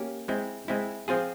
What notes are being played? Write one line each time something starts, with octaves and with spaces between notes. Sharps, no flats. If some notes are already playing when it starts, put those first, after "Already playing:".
Already playing: A#3 C#4 G4
G#3 C4 E4
G#3 C4 E4
F3 C4 F4 G#4